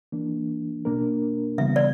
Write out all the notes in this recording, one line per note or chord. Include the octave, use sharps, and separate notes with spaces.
E3 A#3 D4
B2 A#3 D4 A#4
C#3 E3 G3 B3 E5
D5